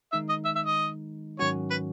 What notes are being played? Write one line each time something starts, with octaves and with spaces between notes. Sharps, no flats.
D#3 G#3 D#4 E5
D#5
E5
E5
D#5
G#2 D#3 F#3 C#4 F#4 C#5
B4